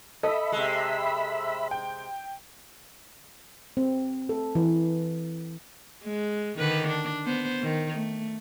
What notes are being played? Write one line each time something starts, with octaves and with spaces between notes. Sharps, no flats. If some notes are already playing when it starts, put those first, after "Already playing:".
A4 D#5 E5 B5
C3 G#3
G5
C4
A4
E3
G#3
D3 D#3 B4
D4
B3 C5
D#3
A3